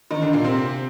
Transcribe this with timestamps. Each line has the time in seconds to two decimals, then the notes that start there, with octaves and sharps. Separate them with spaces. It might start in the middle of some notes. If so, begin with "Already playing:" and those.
0.11 D#3 D#4
0.22 D3 D4
0.33 A#2 A#3
0.44 C3 C4